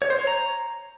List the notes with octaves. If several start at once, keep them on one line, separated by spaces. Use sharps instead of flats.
C#5
C5
C#5
A#5